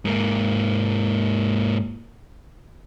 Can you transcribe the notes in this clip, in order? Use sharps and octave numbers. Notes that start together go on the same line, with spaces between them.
G#2 A#3